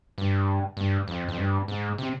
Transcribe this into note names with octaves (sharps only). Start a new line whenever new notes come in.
G2
G2
F2
F2
G2
G#2
C3